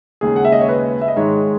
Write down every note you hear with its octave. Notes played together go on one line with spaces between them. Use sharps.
D#2 C#3 G#3 G#4
F#5
E5
D#5
C#5
B4
E5
D#5
G#2 D#3 G#3 C#5